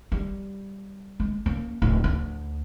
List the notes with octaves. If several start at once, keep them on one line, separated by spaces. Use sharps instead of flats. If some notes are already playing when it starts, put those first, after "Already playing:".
G3
G#3
A#3 C#4
D1 A2
D2